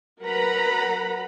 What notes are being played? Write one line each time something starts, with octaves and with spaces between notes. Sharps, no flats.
F#3 A#4 B4 F#5 A#5 B5